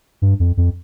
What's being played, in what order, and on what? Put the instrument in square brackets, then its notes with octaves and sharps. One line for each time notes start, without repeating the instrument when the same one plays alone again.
[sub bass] G2
F2
F2